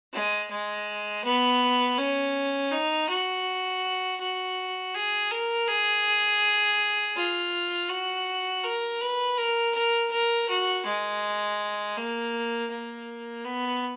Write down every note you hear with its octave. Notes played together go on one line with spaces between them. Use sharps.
G#3
G#3
B3
C#4
D#4
F#4
F#4
G#4
A#4
G#4
F4
F#4
A#4
B4
A#4
A#4
A#4
F#4
G#3
A#3
A#3
B3